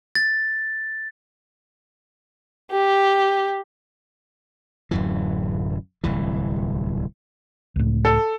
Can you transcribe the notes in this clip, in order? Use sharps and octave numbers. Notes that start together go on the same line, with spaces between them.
A6
G4
D1 F#2 E3
D1 C2 E3
C#2 A2
A4